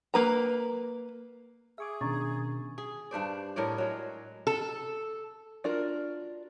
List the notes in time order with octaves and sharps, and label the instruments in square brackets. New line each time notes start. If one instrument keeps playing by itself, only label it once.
[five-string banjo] A#3 B4 A#5
[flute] G#4 [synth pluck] E5 C#6 D6
[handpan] B2 D#3 [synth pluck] C#4 D4 [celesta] A#5 C#6 A6
[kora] G#4
G2 D4 C5 D5
A2 A#4 C#5 D5
F#3 G#3
[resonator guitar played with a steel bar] A4
[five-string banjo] D4 F4 F#4 A#4